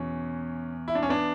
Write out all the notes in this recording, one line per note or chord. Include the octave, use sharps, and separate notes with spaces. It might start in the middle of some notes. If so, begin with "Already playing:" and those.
Already playing: E2 B2 C#4
E4
D4
C#4
B3 D4